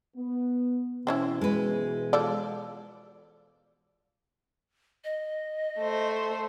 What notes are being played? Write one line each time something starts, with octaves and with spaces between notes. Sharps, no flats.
B3
B2 E3 C4 C#4 E4
G#3 B4
F3 A4 D5
D#5
A3 C5